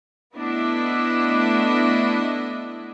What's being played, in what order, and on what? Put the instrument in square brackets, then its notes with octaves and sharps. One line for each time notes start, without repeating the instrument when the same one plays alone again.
[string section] A3 B3 D4 E4 D#5